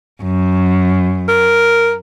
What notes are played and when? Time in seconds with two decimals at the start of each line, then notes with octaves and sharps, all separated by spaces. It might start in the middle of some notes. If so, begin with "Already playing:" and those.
0.23 F#2
1.28 A#4